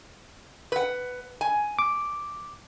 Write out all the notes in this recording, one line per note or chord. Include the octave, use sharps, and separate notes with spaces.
B4 F#5
G#5
D6